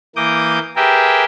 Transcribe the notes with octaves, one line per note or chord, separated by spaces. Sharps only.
E3 A#3 D6 D#6 G6
G4 G#4 A#4 B4 E5 G5